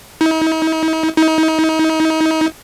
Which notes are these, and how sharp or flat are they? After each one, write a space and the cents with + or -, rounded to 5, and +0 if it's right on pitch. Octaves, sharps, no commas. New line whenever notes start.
D#4 +45
D#4 +35